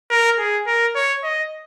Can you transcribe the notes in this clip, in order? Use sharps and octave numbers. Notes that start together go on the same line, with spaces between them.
A#4
G#4
A#4
C#5
D#5